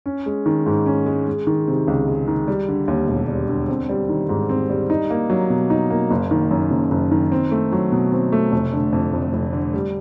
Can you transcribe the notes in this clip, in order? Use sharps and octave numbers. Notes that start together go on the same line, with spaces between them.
C#4
G#3
D#3
G#2
C#4
G#3
G#3
D#3
C3
C#2
G#3
D#3
G3
D3
D#2
E1
G3
D3
C4
G3
D#3
G#2
C4
G3
D#4
A#3
F#3
B2
D#4
A#3
F#1
D#3
F#2
F#1
F#1
D#3
C4
A3
F#3
B2
C4
A3
F1
D3
F2
F1
F1
D3
G3